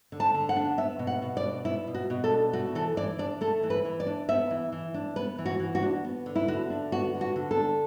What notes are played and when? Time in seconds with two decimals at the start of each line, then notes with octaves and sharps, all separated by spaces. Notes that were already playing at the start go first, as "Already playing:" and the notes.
0.12 D3
0.20 A5
0.34 D3
0.49 F#5
0.56 D4
0.78 B3 E5
0.99 B2
1.07 F#5
1.22 B2
1.37 D5
1.44 D4
1.65 B3 E4
1.87 B2
1.94 F#4
2.10 B2
2.24 A4
2.31 D4
2.53 A3 F#4
2.75 E3 A4
2.97 E3 D5
3.19 D4 D5
3.41 A3 A4
3.63 E3
3.70 B4
3.85 E3
4.00 D5
4.07 D4
4.28 B3 E5
4.51 E3
4.72 E3
4.94 D4
5.16 B3 B4
5.38 E3
5.46 F#4
5.60 E3
5.75 F#4
5.83 D4
6.04 B3
6.26 D3
6.36 E4
6.48 D3 F#4
6.70 D4
6.92 B3 F#4
7.14 D3
7.21 F#4
7.36 D3
7.51 A4
7.57 D4